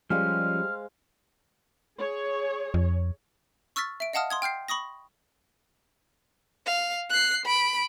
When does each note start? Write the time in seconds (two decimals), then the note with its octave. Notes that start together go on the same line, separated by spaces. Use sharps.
0.10 F3 G3 G#3 C#4 C5 F5 F6
1.98 G#4 C#5
2.74 F2
3.76 C#6 E6 F6 A6 B6
4.00 E5 D7
4.13 D#5 F5 F#5 A5 D#6 F6
4.30 C6 D#6 G#6
4.42 G5 F6 G6 C7
4.68 B5 C#6 D#6 A#6
6.66 F5
7.10 F#6 C7
7.46 B5 D7